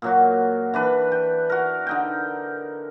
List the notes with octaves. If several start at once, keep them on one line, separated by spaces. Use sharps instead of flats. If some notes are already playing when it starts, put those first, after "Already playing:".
A#2 F#3 F#4
E3 D4 B4
G5
F#4 A#4
D3 D#4 G5